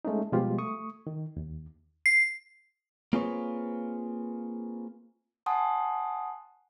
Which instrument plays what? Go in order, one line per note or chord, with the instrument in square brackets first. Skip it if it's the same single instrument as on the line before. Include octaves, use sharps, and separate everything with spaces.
[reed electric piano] G#3 A3 C#4 D#4
B2 F3 G3 G#3 F4 G4
A3 C#6 D#6
D#3
D#2
[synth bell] C7
[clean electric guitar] A#3 C4 F4 G#4 B4 C#5
[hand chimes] F#5 G#5 A5 C6 D#6